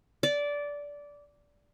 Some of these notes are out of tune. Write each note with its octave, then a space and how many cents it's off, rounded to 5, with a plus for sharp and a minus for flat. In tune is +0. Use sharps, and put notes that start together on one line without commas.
D5 -15